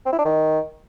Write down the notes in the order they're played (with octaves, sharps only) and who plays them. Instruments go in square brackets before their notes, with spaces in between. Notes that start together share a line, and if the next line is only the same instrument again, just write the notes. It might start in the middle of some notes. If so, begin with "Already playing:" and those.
[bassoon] C4
E4
D4
D#3